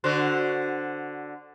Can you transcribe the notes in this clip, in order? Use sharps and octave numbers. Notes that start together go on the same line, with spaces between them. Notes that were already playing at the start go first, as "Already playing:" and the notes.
D3 F#4 C5